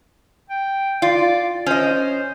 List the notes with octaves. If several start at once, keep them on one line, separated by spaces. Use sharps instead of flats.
G5
F4 D5
C#4 C5 D#5